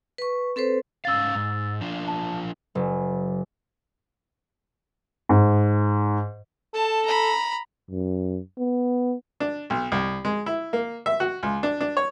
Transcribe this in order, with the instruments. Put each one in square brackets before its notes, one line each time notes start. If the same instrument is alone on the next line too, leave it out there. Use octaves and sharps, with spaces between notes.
[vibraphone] B4 C#6
C4 A4 B4 C5
[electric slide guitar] G#2 C#4 F5 [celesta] E6 A6
[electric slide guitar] G#2
F3 D4 F4
[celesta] A5
[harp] F#1
[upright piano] G#2
[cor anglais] A4 [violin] A5
[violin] A#5 B5
[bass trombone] F#2
B3
[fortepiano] D4
B1
C2
G#3
E4
A#3
E5
F#4
C#2
D4
D4
C#5